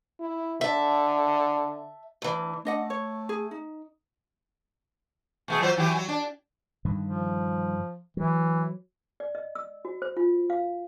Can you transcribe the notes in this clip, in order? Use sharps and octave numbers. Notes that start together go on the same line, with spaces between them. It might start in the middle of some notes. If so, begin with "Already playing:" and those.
E4
D3 E5 A5
D2 E3
A3 D4 D#5 F#5
C#5
G#4
D#4
B2 A3 G#4
F#3 F4 C5
E3 F#3 G4
F#3
D4
G2 D3 D#3
F3
E3 F#3
D5
D#5
E6
F#4
C5
F4
F5